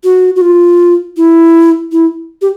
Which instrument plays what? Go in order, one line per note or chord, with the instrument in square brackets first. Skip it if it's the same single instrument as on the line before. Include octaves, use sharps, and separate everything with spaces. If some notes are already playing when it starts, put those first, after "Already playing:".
[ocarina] F#4
F#4
F4
E4
E4
G4